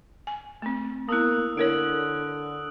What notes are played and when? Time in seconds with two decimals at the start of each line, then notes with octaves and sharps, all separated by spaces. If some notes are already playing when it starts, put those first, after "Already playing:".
0.27 G#5
0.62 A3 C4
1.09 A#3 B3 E4 D#6 E6 F#6
1.57 D3 E4 A#4 C#5 D7 F#7